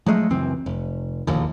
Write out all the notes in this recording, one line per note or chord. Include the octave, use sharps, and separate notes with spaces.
F3 F#3 G#3 A3
C#2 F#2 E3 C4
F1
E1 A#1 D#2